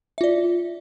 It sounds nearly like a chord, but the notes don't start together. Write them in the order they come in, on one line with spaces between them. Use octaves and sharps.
E5 F4 D5